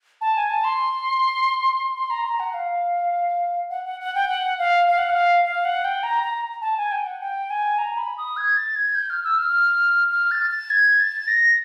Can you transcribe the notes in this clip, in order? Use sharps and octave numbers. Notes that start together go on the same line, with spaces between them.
A5
G#5
A5
C6
C6
A#5
A#5
F#5
F5
F#5
F#5
F#5
G5
F#5
F5
F5
F#5
F5
F5
F#5
G5
A#5
A#5
A5
G#5
G5
F#5
G5
G#5
A#5
B5
D#6
G#6
A6
G#6
G6
F6
E6
F6
F6
A6
A6
G#6
A6
A#6